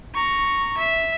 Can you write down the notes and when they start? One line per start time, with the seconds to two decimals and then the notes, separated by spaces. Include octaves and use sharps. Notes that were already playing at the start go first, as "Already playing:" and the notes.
0.14 A#5 C#6
0.78 E5